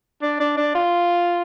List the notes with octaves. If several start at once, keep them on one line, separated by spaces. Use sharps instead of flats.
D4
D4
D4
F4